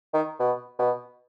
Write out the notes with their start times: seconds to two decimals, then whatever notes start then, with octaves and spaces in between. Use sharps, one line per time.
0.14 D#3
0.40 B2
0.79 B2